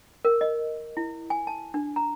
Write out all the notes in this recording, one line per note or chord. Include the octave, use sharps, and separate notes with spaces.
A#4
D#5
E4
G#5
A5
D4
A#5